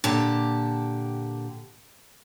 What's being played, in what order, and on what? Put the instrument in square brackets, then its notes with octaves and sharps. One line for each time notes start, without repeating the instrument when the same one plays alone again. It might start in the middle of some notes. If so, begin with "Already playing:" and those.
[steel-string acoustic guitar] A#2 D3 G4 A5